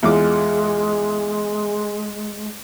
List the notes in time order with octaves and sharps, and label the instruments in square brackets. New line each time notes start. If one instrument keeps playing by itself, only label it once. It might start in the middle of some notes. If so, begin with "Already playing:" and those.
[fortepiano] E2 F4 D6 [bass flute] G#3